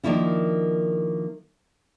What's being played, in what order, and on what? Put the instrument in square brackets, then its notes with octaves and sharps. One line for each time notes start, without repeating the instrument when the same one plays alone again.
[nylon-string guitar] D#3 F3 A#3 D4 E4 F4